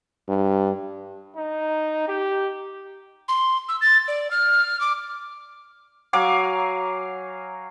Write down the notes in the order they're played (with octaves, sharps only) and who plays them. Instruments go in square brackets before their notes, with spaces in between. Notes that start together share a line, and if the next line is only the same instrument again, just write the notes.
[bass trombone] G2
[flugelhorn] D#4
G4
[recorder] C6
E6
A6
D5
F6
D6
[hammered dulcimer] F#3 F5 G#5 D6